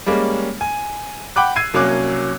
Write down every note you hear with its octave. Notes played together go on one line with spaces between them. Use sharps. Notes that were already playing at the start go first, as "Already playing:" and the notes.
G3 G#3 A#3 C#4
G#5
F#5 G5 B5 D6 F#6
E6 G#6 C7 D#7
C2 F#3 A#3 C#4 D6 F#6